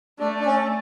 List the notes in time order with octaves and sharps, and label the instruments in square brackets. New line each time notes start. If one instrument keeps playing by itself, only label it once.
[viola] A3 [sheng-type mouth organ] D4
[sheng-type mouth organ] D4
C#4